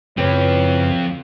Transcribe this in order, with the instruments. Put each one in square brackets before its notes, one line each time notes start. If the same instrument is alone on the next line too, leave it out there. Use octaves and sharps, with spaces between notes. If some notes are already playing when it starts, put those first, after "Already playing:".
[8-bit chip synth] F#2 C#3 [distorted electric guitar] F3 C4 [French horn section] E4 C#5 [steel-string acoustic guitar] G4 B4